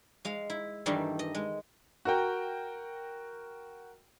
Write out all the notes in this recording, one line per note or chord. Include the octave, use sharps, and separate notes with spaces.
G#3 F5
E4
G2 D#3 E3 G3 A3
D#5
G#3
F#4 A#4 G5